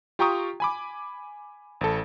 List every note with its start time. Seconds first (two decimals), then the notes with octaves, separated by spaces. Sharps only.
0.19 F4 G4 G5 A#5 C#6 D#6
0.60 G#5 B5 D6
1.81 A1 A4